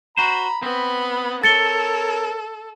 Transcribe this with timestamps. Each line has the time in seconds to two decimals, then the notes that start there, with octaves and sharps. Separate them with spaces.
0.17 F#4 C5 A#5 B5
0.62 B3 C4 B5
1.44 A4 A#4 C#5 A6 C#7 G7